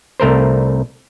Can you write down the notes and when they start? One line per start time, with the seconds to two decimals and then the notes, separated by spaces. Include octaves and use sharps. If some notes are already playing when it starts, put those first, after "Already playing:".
0.20 C2 A3 A#4 C5